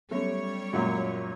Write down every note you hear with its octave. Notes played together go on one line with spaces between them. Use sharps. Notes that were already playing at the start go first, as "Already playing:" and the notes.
F#3 G3 A3 B3 C#4 C#5
F#2 A#2 G#3